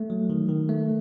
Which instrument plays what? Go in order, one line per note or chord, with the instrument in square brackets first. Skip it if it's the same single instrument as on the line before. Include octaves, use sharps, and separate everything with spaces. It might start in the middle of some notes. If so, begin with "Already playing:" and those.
Already playing: [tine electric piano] A3
F#3
D#3
D#3
A3